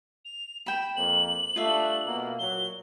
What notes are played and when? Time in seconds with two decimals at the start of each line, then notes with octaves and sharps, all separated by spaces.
0.25 F7
0.66 G5 B5 E7
0.96 F2 A#3 F#7
1.56 G3 A3 D4 F4 E5
2.05 B2 A#3
2.39 A#2 F#3 G7